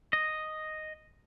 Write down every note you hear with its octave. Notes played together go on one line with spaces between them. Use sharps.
D#5